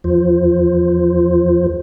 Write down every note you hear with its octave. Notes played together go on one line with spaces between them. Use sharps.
E2 F3 F4 C5